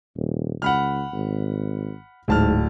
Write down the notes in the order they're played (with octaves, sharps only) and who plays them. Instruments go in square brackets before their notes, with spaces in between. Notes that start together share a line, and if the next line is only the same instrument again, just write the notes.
[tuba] D#1
[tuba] C#2 [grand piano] F#5 B5 F6
[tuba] G#1
[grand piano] D1 A5 F6 [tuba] G#2